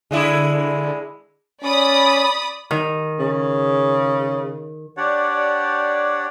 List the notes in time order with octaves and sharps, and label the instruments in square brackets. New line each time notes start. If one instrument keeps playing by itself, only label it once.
[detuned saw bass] D3 [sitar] G#3 D4 E4
[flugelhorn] C#4 [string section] D5 B5 D#6
[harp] D#3
[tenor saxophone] C#3
[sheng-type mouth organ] D4 G4 C#5 D5 F#5